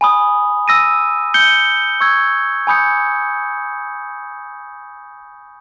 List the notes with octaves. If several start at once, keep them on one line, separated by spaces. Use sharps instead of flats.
G#5 B5 D#6
E6 A#6 D#7
G6 C#7 G7
C#6 E6 G#6
G#5 B5 D#6 G6 C#7